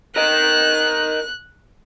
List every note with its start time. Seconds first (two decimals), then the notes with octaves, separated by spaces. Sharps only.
0.16 A#4 D#5 F#6